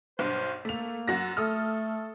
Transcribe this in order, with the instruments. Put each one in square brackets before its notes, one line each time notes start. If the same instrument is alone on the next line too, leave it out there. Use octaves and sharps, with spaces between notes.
[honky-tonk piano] B1 G2 [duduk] C5
[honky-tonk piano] A3 F7 [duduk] A#3
[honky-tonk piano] F#2 F#4 A#6
[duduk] A3 [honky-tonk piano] A4 D#6 F6